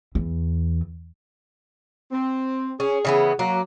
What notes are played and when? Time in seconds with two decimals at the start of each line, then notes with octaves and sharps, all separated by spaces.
0.15 E2
2.11 C4
2.80 C#4 G#4
3.05 C#3 E3 B3
3.39 F#3 A#3